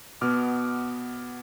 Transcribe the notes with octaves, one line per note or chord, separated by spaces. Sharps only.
B2 B3 D6 F6